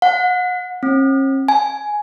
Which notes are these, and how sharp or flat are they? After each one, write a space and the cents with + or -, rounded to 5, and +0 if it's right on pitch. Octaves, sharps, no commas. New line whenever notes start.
F#5 -35
C#4 -45
G#5 +10